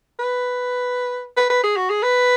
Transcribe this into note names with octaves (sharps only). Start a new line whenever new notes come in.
B4
B4
B4
G#4
F#4
G#4
B4